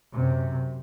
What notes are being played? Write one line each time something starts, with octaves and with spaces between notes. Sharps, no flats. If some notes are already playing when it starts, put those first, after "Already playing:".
F#2 C3